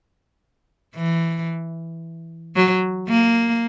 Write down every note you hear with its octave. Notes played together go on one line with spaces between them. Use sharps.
E3
F#3
A#3